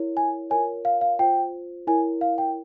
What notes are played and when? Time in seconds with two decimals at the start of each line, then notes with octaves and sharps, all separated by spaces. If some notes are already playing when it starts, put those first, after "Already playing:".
Already playing: E4 A#4 C#5
0.17 G#5
0.50 F4 A#4 C#5 G#5
0.85 F5
1.01 F5
1.19 F4 C5 G5
1.87 E4 A#4 C#5 G#5
2.21 F5
2.38 G5